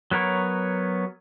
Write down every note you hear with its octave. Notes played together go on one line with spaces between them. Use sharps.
F#3 B3 A#4 C#5